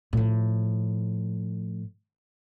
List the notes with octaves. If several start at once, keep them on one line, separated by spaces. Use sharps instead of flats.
A2 F3